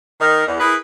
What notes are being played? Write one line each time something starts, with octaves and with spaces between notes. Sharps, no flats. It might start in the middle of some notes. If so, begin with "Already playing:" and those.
D#3 A#4
E2
E4 G#4 A#4 B4